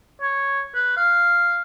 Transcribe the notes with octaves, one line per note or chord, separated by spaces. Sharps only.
C#5
B4
F5